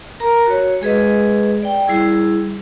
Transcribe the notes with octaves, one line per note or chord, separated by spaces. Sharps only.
A#4 A#5
F#4 C#5
G#3 G#4 B4 D#5
D5 G5
G3 E4 G#4